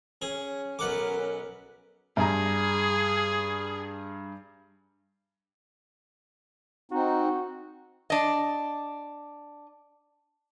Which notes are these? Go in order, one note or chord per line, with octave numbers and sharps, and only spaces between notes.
C#4 G#4
B1 A#4 B4 F#5 D6
G2 G#4 G#5 A#5
C4 D#4 F#4
D4 D#5